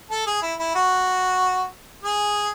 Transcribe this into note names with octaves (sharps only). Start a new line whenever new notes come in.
A4
G#4
E4
E4
F#4
G#4